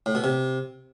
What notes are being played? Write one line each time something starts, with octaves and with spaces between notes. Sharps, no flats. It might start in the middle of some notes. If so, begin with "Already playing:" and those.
A2
B2
C3